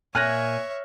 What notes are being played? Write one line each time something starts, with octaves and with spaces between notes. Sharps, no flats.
A#2 C#5 E5 G#5 F6 F#6 A#6